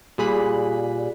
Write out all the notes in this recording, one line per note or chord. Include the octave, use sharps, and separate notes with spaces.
A#2 G3 G#4 B5 F#6 B6